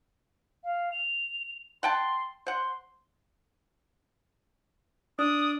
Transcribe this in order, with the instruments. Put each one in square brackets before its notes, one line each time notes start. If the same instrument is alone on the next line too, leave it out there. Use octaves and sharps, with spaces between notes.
[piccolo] F5
F7
[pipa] F#5 G5 A5 [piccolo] C6
[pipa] C5 F#5 [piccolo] C6
[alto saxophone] D4 [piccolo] D#6